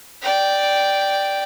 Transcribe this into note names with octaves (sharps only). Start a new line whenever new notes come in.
D5 G5